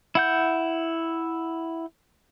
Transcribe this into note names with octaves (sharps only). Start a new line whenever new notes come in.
E4 F#5 G6